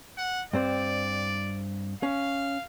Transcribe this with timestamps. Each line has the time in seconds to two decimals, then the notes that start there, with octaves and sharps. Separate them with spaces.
0.18 F#5
0.53 G2 C4 C5 D5
2.03 C#4 F5